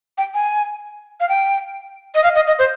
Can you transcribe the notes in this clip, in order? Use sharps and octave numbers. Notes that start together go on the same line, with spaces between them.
G5
G#5
F5
G5
D#5
F5
D#5
D#5
C5